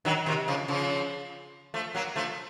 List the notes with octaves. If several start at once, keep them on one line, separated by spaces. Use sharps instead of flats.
D#3 F#3
C3 D#3
C#3 F3
C#3 F3
F3 A3
F#3 A#3
F3 A3